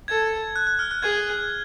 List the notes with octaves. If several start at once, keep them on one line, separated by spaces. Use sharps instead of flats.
A4 G#6
F#6
F#6
F6
F#6
G#4 G#6